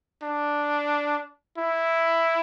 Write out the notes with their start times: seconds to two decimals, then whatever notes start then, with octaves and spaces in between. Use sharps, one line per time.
0.23 D4
1.58 E4